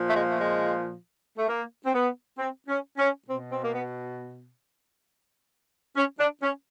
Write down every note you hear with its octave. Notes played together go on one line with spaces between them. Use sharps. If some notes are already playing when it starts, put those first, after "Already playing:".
Already playing: A#2 F3
A3
G#3
A3
G#3
A3
A#3
C4
B3
C4
C#4
C#4
B2 C4
C4
A#3
B3
C#4
D4
C#4